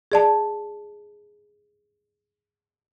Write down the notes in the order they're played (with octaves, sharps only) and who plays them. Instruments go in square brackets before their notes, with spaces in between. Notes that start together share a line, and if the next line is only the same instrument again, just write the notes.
[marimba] G#4 D5 A5